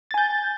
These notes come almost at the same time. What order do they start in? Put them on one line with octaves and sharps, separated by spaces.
A6 G#5 G6